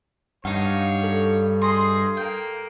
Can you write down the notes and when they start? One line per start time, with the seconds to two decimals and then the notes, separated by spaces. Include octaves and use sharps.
0.45 G2 D#4 C#5 F5 F#5
1.03 A4
1.62 G#4 D#5 C6
2.17 A#3 G5